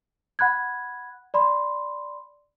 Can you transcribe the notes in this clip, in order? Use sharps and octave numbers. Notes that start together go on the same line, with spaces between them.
F#5 B5 F#6 G#6
D5 B5 C6